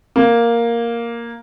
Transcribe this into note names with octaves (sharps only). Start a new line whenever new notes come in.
A#3